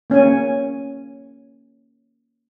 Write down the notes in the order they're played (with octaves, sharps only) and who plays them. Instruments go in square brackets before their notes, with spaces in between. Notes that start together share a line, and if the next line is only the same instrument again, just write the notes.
[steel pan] A#3 C#4 C#5 G#5